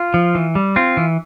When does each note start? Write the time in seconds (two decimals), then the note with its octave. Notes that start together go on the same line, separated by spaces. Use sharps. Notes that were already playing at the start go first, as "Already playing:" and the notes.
Already playing: F4
0.14 F3
0.35 E3
0.55 G3
0.76 C4 F4
0.97 E3